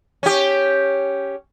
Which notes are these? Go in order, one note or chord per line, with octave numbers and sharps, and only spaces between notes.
C#4 G4